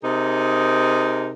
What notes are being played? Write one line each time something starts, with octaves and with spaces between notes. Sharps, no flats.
C3 D#4 G#4 A#4